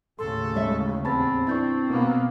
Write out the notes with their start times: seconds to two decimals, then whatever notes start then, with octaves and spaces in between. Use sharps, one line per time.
0.19 D#2 A2 C#3 A4 C6
0.56 G#3 C#5 E5
1.05 E2 C4 A5 B5 A6
1.47 D4 E4 C#6 G6 A6
1.88 B2 A#3 B3